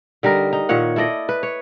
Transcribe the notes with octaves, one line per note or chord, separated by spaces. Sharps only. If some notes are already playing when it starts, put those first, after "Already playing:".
D3 G3 D#4 A#4
D#4
A#2 D#3 C#5 F#5
E4 A4 D5 D#5
B4
C#5